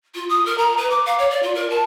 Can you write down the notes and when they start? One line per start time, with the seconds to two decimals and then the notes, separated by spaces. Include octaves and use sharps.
0.15 F4
0.29 D#6
0.46 A#4
0.58 A#5
0.77 B4
0.90 D6
1.06 F5
1.19 C#5
1.31 D5
1.43 F4
1.55 A#4
1.70 A5